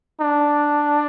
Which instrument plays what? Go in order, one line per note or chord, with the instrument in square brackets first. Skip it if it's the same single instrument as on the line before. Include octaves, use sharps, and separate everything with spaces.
[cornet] D4